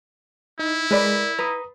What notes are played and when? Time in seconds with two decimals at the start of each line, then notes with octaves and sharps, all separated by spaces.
0.59 D#4 E4
0.91 G#3 A#4 B4 D5
1.39 B4 A#5 D#6